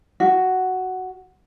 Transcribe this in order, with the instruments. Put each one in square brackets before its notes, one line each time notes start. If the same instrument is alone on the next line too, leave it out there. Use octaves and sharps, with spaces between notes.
[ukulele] F#4